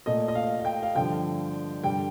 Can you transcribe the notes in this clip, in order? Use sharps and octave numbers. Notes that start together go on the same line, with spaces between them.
A#2 A3 D#5
D#5
F5
F5
G5
F5
G2 D3 F3 G5
G2 D3 G3 G5